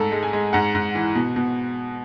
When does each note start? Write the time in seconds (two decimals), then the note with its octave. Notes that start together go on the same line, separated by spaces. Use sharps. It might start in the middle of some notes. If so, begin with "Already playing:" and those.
Already playing: G#2 A3 A4
0.12 G#3
0.23 G#5
0.33 G#3
0.53 G#2 F#5
0.75 G#2
0.95 E3
1.15 B2
1.36 B2